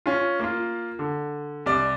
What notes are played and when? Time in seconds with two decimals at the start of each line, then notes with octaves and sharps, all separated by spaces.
0.06 C#4 F4
0.40 A#3 F4
0.99 D3
1.66 C2 D5